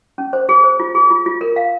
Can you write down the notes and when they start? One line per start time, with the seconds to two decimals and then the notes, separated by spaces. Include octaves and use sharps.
0.18 C#4
0.33 C5
0.49 G#4
0.64 C5
0.80 F4
0.95 G#4
1.10 F4
1.26 F4
1.41 A#4
1.56 F5